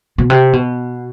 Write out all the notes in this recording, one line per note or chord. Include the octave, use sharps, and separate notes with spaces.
B2
C3
B2